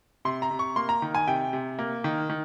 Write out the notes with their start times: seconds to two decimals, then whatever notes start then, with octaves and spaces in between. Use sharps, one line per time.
0.25 C3 C6
0.42 A#5
0.51 C3
0.59 C#6
0.76 A#3 C6
0.89 A#5
1.02 D#3
1.15 G#5
1.27 C3 G5
1.53 C3
1.79 A#3
2.04 D#3
2.30 D#3